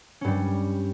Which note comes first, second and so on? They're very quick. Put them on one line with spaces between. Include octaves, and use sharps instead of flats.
C#4 G2 G3